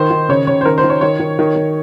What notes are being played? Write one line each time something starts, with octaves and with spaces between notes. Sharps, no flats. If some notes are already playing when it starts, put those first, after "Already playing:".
Already playing: D#3 C5
D#3
C#3 C#5
C#3 C#5
C5
D#3 A#4
C5
D#3
C#5
D#3 C#5
D#3
D#3
D#3